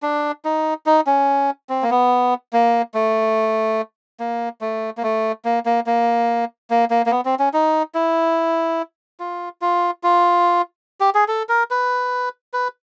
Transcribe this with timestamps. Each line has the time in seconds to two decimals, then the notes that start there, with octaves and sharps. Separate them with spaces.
0.02 D4
0.45 D#4
0.86 D#4
1.07 C#4
1.69 C4
1.82 A#3
1.90 B3
2.53 A#3
2.94 A3
4.20 A#3
4.61 A3
4.97 A#3
5.03 A3
5.45 A#3
5.66 A#3
5.86 A#3
6.70 A#3
6.90 A#3
7.06 A#3
7.11 B3
7.25 C4
7.39 C#4
7.54 D#4
7.95 E4
9.20 F4
9.62 F4
10.03 F4
11.00 G4
11.15 G#4
11.28 A4
11.49 A#4
11.71 B4
12.53 B4